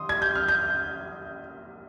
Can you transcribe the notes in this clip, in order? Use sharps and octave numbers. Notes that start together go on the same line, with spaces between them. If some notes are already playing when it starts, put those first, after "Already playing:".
Already playing: D#3 C6 D#6
G#6
G6
F6
G6